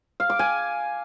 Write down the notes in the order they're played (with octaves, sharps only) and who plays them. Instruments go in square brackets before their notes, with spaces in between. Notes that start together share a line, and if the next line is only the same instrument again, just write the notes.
[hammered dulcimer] F5
D6
G#5